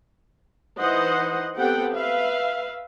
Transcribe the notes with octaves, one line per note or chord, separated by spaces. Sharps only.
E3 D#4 C5 D#5 F#5
B3 C4 G4 A4 F#5 G5
B4 E5 F5